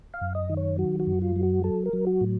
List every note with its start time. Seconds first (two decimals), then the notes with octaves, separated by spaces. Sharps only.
0.14 F5
0.21 F#2
0.35 D#5
0.50 D#3
0.57 C#5
0.78 F#3 F#4
1.00 F#4
1.07 F#2
1.22 F4
1.36 F#3
1.43 F#4
1.64 F#3 A4
1.86 A#4
1.93 F#3
2.07 F#4
2.21 A2